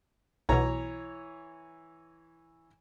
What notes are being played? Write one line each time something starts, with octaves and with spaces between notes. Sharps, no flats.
B1 B2 E3 C#5 A#5